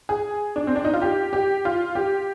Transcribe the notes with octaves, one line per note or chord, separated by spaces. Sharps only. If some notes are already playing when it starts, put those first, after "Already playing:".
G#4
D4
C4
D4
D#4
F4
G4
G4
F4
G4